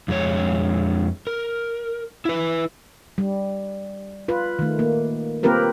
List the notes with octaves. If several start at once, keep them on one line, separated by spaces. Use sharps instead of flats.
F2 G#3 C#5
A#4
E4 B4
G3
F4 B4
D#3 A3
A#3
A#3 C4 F4 G4 A#4 B4